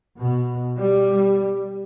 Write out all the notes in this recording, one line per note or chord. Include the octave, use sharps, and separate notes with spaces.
B2
G3